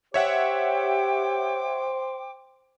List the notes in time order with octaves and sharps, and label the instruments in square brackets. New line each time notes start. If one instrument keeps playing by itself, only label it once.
[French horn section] G4 [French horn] C5 [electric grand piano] C#5 E5 F#5 [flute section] G5 D6